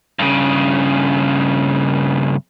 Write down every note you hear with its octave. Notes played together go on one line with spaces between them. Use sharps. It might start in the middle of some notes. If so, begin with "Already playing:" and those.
G2 C#3